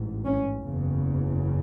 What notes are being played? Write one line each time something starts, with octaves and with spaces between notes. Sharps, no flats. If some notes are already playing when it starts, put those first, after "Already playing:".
Already playing: A1 G#2
C#4
F#1 E2 C#3